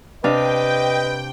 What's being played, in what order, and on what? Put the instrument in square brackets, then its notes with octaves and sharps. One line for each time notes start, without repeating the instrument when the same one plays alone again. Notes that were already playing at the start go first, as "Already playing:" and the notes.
[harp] C3 D4 F5 [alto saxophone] B4 [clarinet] D#5 [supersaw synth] G5